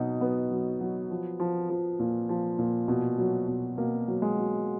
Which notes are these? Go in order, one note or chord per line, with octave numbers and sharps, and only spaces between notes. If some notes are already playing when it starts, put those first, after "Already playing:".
Already playing: B2 F#3 D#4
F#3 B3
F#3
F#3
F3
F3
F3
A#2
F3
A#2
B2
F#3
B2
B2 A#3
F#3
G#3
F#3